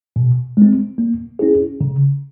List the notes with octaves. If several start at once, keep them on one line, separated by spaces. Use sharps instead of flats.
B2
G#3 C4
A#3
C#4 E4 G#4
C#3